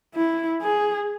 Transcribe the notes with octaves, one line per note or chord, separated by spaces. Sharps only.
E4
G#4